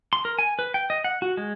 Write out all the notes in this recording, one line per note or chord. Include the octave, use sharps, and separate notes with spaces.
C6
A#4
G#5
B4
G5
D#5
F#5
F#4
G#3